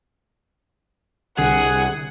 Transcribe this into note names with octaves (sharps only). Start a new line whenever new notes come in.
C2 D3 G#4 F#5